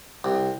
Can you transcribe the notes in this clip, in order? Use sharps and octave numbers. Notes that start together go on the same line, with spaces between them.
C2